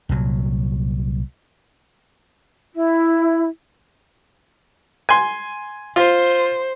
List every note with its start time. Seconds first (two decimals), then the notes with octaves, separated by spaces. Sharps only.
0.09 C2 A#2 F#3
2.74 E4
5.09 G#5 C6
5.96 F4 C5